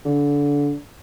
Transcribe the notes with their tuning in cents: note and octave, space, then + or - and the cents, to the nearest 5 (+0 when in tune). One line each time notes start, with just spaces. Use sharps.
D3 -25